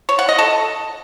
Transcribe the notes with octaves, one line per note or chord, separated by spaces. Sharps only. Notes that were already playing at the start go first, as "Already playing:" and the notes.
C#5
F#5
D#5
A4